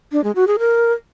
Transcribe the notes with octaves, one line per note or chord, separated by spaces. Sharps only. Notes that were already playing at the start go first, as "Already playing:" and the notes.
D4
G#3
F#4
G#4
A#4